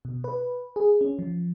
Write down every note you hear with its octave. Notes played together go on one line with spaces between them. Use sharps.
B2
B4
G#4
C#4
F3